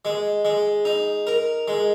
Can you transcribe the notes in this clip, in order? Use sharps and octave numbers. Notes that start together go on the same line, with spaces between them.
G#3
G#3
D#4
A#4
G#3